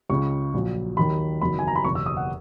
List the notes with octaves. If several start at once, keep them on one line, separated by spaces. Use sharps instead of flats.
C#2 C#3 G#3 C#6
A#1 A#2 F#3
D#2 D#3 F#3 B5
F#1 E2 D#3 F#3 B5
G#5
A#5
B5
F#1 E2 B2 C#6
E6
D#6
F#5